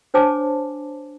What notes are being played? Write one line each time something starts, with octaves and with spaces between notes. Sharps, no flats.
D4 C5 C#5 G#5 A5 D6